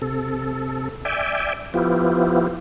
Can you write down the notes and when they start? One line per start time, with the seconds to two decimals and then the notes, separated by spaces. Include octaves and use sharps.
0.02 C3 A4
1.05 D5 E5 G5 G#5
1.74 F3 B3 E4 F4 G4